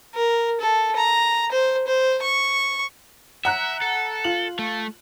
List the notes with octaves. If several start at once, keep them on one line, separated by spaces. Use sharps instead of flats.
A#4
A4
A#5
C5
C5
C#6
E5 F#5 A#5 F#6
A4
F4 F#7
A3